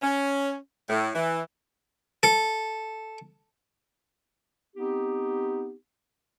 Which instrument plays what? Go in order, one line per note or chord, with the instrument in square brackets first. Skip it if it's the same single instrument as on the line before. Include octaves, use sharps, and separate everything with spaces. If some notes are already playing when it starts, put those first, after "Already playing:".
[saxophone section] C#4
A2
E3
[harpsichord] A4
[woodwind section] B3 C4 D#4 G4